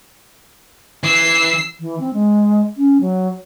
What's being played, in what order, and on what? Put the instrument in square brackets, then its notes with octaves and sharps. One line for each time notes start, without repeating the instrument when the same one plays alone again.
[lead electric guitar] E3 [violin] E6 C7
[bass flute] E3
C4
G#3
C#4
F#3